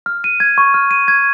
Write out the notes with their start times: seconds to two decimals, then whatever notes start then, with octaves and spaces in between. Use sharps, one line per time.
0.06 F6
0.24 D#7
0.40 G#6
0.58 C#6
0.74 F6
0.91 D#7
1.08 G#6